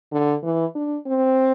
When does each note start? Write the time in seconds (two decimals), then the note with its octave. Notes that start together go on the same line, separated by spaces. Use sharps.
0.12 D3
0.43 E3
0.75 D4
1.07 C4